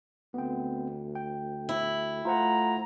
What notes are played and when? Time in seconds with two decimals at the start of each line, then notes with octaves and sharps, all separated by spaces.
0.34 D2 B3 C4 G5
1.15 G5
1.69 E4
2.25 A3 F4 C5 F#5 A#5